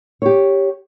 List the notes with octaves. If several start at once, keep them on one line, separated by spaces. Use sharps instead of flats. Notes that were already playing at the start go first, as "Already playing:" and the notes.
G4 C#5